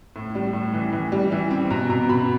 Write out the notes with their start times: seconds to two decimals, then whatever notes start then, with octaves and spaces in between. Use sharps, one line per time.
0.16 A2
0.35 G3
0.53 A2
0.74 E3
0.93 E3
1.12 G3
1.32 E3
1.51 C4
1.70 B2 A#5
1.90 B2 A#5
2.09 B2 B5